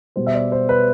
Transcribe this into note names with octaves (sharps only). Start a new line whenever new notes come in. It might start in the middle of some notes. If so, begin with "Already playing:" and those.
B2 G3 B3 C5
E5
D5
C5
B4